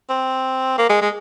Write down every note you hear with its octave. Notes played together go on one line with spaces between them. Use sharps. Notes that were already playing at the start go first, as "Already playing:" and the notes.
C4
A#3
G#3
G#3